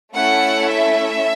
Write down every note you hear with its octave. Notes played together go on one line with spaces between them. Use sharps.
A3 C#4 E4 A4 F#5
E5